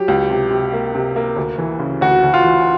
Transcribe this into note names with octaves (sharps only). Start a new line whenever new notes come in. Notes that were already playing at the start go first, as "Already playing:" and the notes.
Already playing: F#3 G4
C#2
C3
C3
A#3
C3
A#3
D2
E3
C#3
D2 F#4
D2
F4
E3